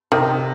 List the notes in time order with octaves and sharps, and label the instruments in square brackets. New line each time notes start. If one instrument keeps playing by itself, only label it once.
[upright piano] C3 [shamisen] D#3